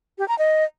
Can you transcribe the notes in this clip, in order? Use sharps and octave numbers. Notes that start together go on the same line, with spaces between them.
G4
A#5
D#5